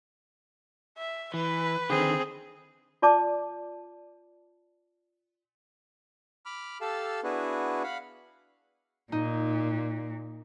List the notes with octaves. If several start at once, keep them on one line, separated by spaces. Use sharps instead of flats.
E5
E3 B4
D3 D#3 C4 G#4
F4 D5 A5 D6
B5 D6 F6
G4 A4 F5 A5 E6
B3 D4 E4 F#4 G#4 B4
F5 F#5 B5
A#2 D#4